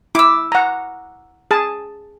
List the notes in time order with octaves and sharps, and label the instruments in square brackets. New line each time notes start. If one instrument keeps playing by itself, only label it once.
[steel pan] E4 [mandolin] D6 E6
[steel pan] F#5 A#5
G#4 A5